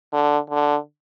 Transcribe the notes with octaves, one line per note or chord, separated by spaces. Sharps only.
D3
D3